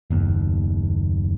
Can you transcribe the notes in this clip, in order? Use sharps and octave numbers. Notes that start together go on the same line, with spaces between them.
F#1 D#2